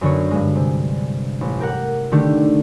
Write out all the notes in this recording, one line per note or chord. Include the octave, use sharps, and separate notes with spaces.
F#2 D3 B3 C#5
G2 G#3
C3
A1
G4 A#4 F#5
D3 D#3 A3 D4 G4